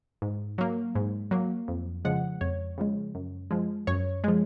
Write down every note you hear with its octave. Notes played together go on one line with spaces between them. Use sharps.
G#2
F#3 A#3
G#2
F#3 A#3
F2
C#3 F3 G#3 F#5
F2 C#5
C#3 F3 G#3
F#2
F3 G#3
F#2 C#5
F3 G#3